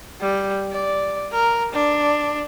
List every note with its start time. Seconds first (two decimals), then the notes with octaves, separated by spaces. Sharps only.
0.21 G3
0.72 D5
1.33 A#4
1.72 D4